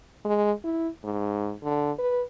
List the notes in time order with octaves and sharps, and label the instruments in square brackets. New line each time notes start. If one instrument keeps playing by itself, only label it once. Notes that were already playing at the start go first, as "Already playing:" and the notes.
[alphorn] G#3
E4
G#2
D3
B4